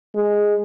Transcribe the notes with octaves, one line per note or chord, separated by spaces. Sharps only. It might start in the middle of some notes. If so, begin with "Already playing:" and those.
G#3